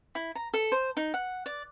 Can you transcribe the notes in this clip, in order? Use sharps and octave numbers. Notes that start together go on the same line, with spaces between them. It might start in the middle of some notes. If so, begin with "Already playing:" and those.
E4
A#5
A4
C5
D#4
F#5
D5